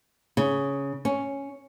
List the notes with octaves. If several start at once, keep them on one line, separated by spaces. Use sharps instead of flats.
C#3
C#4